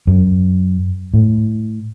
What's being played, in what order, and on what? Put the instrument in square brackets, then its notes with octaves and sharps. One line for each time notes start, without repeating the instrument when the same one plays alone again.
[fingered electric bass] F#2
A2